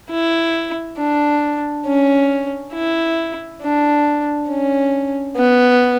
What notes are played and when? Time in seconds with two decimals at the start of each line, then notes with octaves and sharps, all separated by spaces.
0.11 E4
0.98 D4
1.86 C#4
2.73 E4
3.62 D4
4.49 C#4
5.37 B3